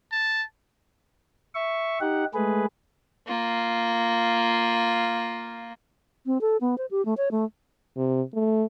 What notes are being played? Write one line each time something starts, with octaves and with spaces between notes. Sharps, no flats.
A5
E5 C#6
D#4 G4 F#5
G#3 A3 G#4 B4
A#3 F4
C4
A4
B3
C5
G4
A3
C#5
A3
C3
A3